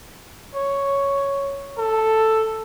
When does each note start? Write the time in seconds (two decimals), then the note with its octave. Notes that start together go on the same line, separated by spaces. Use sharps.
0.55 C#5
1.78 A4